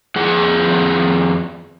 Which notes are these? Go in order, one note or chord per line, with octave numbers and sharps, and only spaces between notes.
F2 G#4 F#5